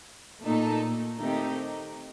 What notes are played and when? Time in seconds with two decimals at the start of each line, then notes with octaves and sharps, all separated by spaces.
0.43 A#2 A3 D#4 A4
1.21 D#3 A3 C4 D#4 G4